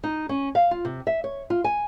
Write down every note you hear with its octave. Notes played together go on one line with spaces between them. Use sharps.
D#4
C#4
F5
F4
C3
E5
C#5
F4
G#5